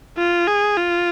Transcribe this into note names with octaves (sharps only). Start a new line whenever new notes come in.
F4
G#4
F4